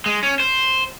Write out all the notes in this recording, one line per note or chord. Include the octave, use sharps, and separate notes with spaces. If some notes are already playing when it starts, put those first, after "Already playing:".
G#3
C#4
C5